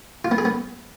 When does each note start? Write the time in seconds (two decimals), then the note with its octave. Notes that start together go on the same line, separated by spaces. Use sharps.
0.25 F4
0.31 B3
0.38 G#4
0.45 B3